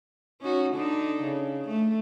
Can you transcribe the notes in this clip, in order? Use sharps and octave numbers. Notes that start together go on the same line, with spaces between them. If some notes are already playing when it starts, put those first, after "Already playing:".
C#4 D#4 F#4
D3 D4 D#4
C#3
A3